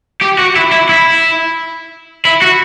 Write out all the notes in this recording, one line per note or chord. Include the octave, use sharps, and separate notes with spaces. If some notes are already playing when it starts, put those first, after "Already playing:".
G4
F#4
E4
E4
E4
E4
F#4